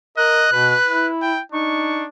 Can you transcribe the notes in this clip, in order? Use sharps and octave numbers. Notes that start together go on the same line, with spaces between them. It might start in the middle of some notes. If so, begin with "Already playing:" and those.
A#4 D#5 F#6
B2 B4
E4
G5
D4 D#4 C#6